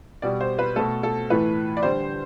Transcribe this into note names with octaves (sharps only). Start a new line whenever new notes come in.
B2 G3 D5
C5
B4
B2 A3 A4
A4
A2 E3 A3 B4
D5
D3 G3 C5